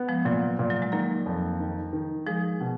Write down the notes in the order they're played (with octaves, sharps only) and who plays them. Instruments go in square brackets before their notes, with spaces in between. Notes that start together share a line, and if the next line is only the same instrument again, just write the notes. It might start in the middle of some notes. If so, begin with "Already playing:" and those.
Already playing: [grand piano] B3
[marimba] F3 G#3
[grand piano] A#2 [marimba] F#3
[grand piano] A#2
[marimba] F#3
G#3
[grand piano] D#3 [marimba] F#3 A#3
[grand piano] F2
D#3
D#3
[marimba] F3 G#3 [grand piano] G#4
[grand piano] B2